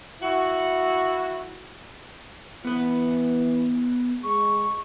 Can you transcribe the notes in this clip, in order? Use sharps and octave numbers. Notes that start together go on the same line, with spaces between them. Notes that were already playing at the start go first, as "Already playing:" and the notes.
E4 F#4
E3 B3 B4
G#3 C#6